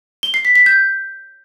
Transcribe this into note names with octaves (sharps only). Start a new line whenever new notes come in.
G7
C7
B6
B6
G6